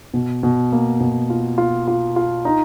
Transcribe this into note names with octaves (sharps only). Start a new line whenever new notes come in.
B2
B2
A#3
B2
F4
F4
F4
F4
D#4